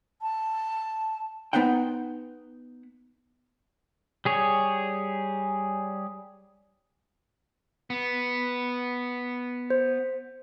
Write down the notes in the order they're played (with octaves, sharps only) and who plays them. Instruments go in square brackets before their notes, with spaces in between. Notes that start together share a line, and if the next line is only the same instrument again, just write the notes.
[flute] A5
[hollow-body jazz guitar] B3 D#4 C5 F#5 G5
[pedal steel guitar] G3 G#4 C#5
[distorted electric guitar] B3
[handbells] C5